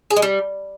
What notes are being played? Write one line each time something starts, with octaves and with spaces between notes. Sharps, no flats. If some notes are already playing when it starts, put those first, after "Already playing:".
G#4
G#3
G3